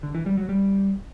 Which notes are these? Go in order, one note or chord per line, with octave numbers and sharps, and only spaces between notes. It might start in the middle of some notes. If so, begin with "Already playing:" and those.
D3
E3
G3
F#3
G3